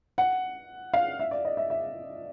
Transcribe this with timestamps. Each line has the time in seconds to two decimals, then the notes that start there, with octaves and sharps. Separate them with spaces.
0.18 F#5
0.93 F5
1.19 E5
1.31 D5
1.45 D#5
1.57 E5
1.70 E5